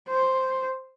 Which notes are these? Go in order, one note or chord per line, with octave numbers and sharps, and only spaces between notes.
C5